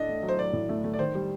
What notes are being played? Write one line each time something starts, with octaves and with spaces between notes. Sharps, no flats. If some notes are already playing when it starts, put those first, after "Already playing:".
Already playing: A2 D4 A4 D#5
A3
F#3
C5
F#3 D5
A2
A3
A3
D5
D#3 C5
G3